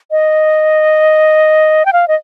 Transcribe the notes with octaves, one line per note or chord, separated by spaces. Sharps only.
D#5
G5
F5
D#5